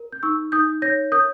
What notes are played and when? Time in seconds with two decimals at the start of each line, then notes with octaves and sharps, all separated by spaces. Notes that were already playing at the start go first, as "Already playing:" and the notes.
Already playing: A#4
0.12 G6
0.23 D#4 C#6 E6
0.52 D#4 D#6 G6
0.82 C#5 G6 A#6
1.12 A#4 D#6 G6